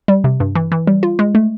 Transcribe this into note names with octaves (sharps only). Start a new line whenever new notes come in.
G3
C3
G2
E3
E3
G3
F4
G#3
A3